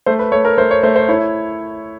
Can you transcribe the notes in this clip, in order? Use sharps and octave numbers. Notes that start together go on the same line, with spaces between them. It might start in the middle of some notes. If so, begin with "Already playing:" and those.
A3 C5
B4
A3 C#5
A#4
A3 C5
C#5
A3 C5
C5
E4 C#5